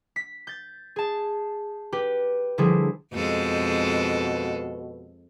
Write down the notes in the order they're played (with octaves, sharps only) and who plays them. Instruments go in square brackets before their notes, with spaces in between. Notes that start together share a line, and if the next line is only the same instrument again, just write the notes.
[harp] B6
G6 A6
G#4 A5
G4 B4
D3 F3 G3 E4 G#4
[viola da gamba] F2 G#3 A4 [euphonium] B2